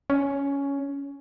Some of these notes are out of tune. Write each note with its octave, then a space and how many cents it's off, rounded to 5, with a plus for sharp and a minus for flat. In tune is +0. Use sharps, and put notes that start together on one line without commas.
C#4 +10